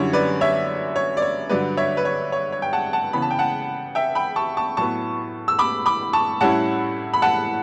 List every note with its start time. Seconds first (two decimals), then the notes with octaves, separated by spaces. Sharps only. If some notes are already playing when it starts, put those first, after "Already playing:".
Already playing: F#2 D3 G3 C#4 E4 C#5
0.13 B4 D5
0.41 C#5 E5
0.96 C#5
1.17 D5
1.22 C#5
1.49 G2 D3 F#3 B4 D5
1.77 C#5 E5
1.97 B4
2.05 C#5
2.32 C#5
2.52 C#5
2.62 G5
2.73 F#5 A5
2.93 F#5 A5
3.13 C#3 E3 B3 B5
3.22 A5
3.31 G5
3.39 F#5 A5
3.95 E5 G5
4.15 G5 B5
4.36 A5 C#6
4.57 A5 C#6
4.77 A2 F#3 B3 A5 C#6
5.48 E6
5.59 B5 D6
5.86 B5 D6
6.13 A5 C#6
6.41 A2 G3 C#4 E4 F#5 A5
7.14 B5
7.22 F#5 A5